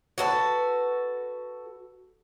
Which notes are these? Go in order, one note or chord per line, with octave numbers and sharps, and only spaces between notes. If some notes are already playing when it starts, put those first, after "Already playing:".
F#4 A4 B4